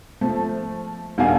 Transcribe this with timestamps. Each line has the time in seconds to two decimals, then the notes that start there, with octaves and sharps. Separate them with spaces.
0.21 F3 A3
1.18 D#1 D#3 D4 F#4 F5 G#5